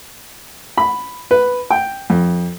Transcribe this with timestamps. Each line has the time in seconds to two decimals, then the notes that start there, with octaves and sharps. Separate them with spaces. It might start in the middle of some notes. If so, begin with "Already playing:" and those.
0.78 B5
1.31 B4
1.70 G5
2.10 F2